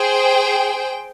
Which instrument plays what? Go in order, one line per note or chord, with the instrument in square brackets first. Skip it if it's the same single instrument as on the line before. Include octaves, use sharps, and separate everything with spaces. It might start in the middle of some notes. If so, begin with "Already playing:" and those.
Already playing: [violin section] G#4 C5 G5